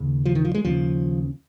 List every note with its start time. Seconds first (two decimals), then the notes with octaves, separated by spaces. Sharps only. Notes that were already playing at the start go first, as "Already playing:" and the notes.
Already playing: D#2 C#3
0.25 F3
0.35 D#3
0.45 F3
0.55 G#3
0.64 D#2 C#3 F3